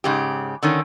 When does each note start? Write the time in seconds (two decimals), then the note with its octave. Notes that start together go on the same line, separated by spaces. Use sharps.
0.04 G#2 C#3 G4
0.63 D3 D#3 C#4